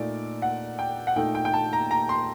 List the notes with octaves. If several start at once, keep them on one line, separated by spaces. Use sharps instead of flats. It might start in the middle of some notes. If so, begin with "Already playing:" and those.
Already playing: A#2 A3 D#4 D5
F#5
G5
F#5
A#2 A3 D#4 G5
G5
G5
A5
A#5
A#5
C6